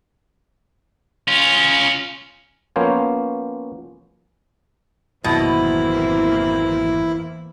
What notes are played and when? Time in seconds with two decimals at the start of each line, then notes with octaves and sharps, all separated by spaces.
1.28 C#4 F4
2.76 F3 A#3 B3 C#4 C5 C#5
5.24 G#1 F2 B2 E3 F#3 A#3 C4 E4